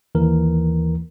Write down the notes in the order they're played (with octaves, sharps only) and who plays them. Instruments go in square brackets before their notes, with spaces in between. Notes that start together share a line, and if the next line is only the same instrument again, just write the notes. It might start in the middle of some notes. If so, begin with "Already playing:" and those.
[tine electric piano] D#2 E3 A#4